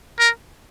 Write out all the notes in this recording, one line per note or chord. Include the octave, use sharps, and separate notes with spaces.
A#4